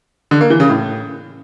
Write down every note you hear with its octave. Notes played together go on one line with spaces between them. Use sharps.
D3
A#3
E3
C#3
A2